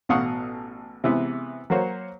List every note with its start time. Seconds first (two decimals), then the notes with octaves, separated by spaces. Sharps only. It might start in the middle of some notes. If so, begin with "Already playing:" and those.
0.09 A1 B2 F5 F#5 C#6 D#6
1.04 C3 E3 G#3 B3
1.70 F#3 A#3 F#4 C5 C#5